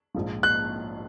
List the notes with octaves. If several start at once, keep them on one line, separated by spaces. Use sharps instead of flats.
A#1 G#2 F3
F#6